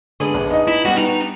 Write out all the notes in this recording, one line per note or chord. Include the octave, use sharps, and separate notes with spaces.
D3 G#3 B3 G#4
A#1 D4
D#4 D#5
E4
G3 B3 F#4 F#5
D#4